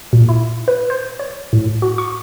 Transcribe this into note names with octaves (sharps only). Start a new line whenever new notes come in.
A#2
E4
B4
C5
C#5
A2
F#4
C#6